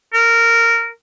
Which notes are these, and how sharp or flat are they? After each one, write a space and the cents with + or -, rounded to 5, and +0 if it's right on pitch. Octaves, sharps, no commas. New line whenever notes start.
A#4 -15